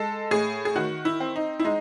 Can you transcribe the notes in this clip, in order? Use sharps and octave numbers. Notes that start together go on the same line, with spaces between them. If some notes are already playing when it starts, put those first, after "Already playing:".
Already playing: G#3 A4
A2 G#4
G#4
D#3 F#4
E4
C4
D#4
E4
G#3 D#4